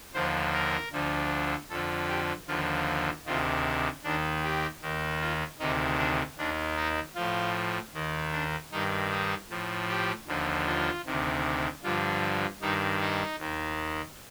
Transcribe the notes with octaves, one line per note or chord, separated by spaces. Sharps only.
D#2 D3 F3 C5
A#4
D2 D3 F3
F2 D3 F3 A4
G4
D#2 D3 F3 F4
D2 C3 D#3 F4
D#2 D#3 D4
G4
D#2 D#3
F4
D2 C3 D#3 D#4
D4
D#2 D#3 D4
D#4
A2 F3 F4
D#2 D#3
D4
G2 D#3 D#4
D#4
A2 F3
G4
D#2 D3 F3
F4
D2 C3 D#3
G2 D3 F3 F4
G2 D#3 D#4
D#4
D#2 D#3